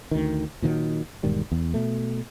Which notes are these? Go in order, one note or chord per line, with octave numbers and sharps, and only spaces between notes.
D2 D#3
A#2 D#3 E3 F#3
E1 G#2 D#3 G3
E2
B2 A3